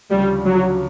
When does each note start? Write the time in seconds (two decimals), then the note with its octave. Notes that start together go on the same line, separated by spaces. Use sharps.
0.11 D2 C#3 F3 G3
0.46 F#3